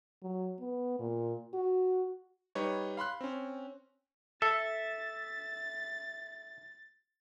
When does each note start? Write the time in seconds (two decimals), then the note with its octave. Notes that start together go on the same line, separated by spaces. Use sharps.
0.22 F#3
0.60 B3
0.99 A#2
1.54 F#4
2.55 G3 D#4 B4 C#5
2.97 F5 B5 C6 F#6
3.21 C4 C#4
4.42 A4 E5 A6